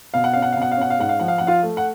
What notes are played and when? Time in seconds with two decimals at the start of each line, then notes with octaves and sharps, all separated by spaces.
0.14 B2 F5
0.24 F#5
0.33 C#4 F5
0.42 F#5
0.52 F5
0.57 B2 F#5
0.71 F5
0.77 C#4 F#5
0.90 F5
0.99 G#2 F#5
1.09 F5
1.20 F3 F#5
1.28 F5
1.38 F3 F#5
1.47 F4 F5
1.63 A3
1.77 F#5